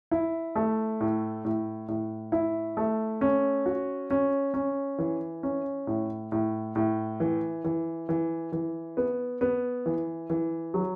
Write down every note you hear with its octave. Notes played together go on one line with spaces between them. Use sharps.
E4
A3
A2
A2
A2
E4
A3
C#4
F#4
C#4
C#4
E3
C#4
A2
A2
A2
E3
E3
E3
E3
B3
B3
E3
E3
F#3